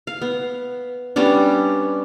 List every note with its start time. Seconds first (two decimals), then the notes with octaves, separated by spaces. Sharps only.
0.07 F5
0.21 B3
1.16 G3 B3 C#4 D4